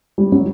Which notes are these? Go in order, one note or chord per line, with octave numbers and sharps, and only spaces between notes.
G3
F#3